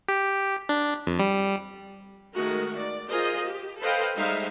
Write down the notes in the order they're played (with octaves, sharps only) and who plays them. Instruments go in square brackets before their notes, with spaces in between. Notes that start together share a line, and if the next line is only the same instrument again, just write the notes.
[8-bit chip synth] G4
D4
F2
G3
[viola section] D#3 G#3 A3 F#4 A#4
D5
F4 G#4 A#4 C5 D#5
G4
A4 B4 C5 D#5 F5 G5
G3 G#3 D#4 C5 E5 F5